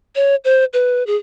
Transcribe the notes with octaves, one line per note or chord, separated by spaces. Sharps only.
C#5
C5
B4
G#4